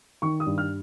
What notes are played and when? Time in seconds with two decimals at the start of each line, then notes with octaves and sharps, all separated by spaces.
0.22 D#3 C#6
0.40 D#6
0.46 G2
0.58 F6